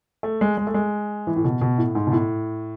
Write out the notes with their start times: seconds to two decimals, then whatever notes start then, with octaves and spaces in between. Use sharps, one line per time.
0.23 A3
0.41 G#3
0.57 G#3
0.67 A3
0.74 G#3
1.27 E3
1.36 A2
1.44 B2
1.61 B2
1.78 A2
1.95 G#2
2.07 B2
2.12 A2